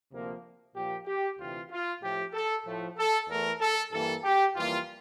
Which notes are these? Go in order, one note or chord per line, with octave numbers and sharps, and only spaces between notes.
D2 C3 F3 A#3
A#2 F3 A#3 G4
G4
D2 C3 E3 F4
F4
A2 F3 A3 G4
A4
A2 F3 A3
A4
E2 E3 A3 A#4
A4
G2 E3 G3 A#3 A4
G4
F2 E3 G3 A#3 F4